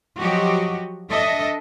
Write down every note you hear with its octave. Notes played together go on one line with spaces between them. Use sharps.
F3 F#3 F#4 G4 D#5
D4 A4 D#5 E5